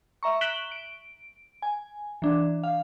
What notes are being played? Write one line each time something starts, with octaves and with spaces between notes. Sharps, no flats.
E5 A#5 C#6
F#6 B6 D7 E7 F#7 G7
D7
G#5
E3 D4
F5